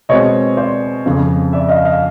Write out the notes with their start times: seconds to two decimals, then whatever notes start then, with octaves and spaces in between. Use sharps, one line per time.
0.09 B2 G#3 C4 C#5 D#5
0.57 C5 D5
1.06 F2 C#3 F3
1.53 D5 E5
1.68 D#5 F5
1.85 D#5 F5